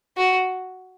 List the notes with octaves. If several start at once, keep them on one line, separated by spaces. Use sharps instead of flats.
F#4